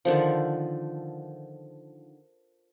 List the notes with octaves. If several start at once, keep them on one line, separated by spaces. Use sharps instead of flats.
D3 D#3 F3